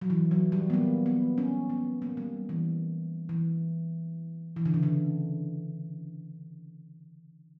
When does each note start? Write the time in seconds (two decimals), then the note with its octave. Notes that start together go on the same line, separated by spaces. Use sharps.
0.01 F#3
0.10 E3
0.31 F#3
0.52 G3
0.70 B3
0.74 A#3
1.06 B3
1.38 C#4
1.70 B3
2.02 A#3
2.17 G3
2.49 E3
3.29 E3
4.56 E3
4.66 D3
4.74 C#3
4.83 D3